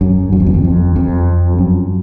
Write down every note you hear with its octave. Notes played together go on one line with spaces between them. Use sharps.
F#2
F#2
F2
E2
F2
F2
F2
F#2